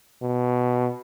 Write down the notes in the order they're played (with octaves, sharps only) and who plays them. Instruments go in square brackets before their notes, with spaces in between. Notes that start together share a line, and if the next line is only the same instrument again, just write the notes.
[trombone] B2